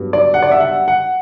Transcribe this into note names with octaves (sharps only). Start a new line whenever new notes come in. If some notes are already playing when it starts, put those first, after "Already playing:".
Already playing: G2 F#3 B3
D5
F#5
D5
E5
F#5
F#5